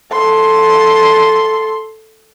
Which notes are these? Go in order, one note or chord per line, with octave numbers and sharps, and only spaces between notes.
A4 C6